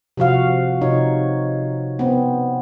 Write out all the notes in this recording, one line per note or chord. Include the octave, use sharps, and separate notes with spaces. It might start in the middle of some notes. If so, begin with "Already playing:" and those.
C3 F3 F#4 F5
C3 D#4 C#5
B3 C4